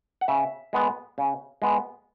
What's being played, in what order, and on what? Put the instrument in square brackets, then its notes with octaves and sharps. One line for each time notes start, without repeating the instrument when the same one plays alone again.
[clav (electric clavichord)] F#5
C#3 E5
G#3 B3
C#3
G#3 B3